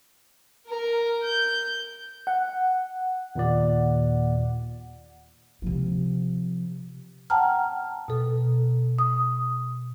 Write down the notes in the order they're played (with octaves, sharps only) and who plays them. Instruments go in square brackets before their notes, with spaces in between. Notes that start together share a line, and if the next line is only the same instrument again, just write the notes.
[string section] A#4
G6
[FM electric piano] F#5
[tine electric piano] D#2 A#2 D5
[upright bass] C3 F3
[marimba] F#5 G5 A5 A#5 F6
B2 A4
D#6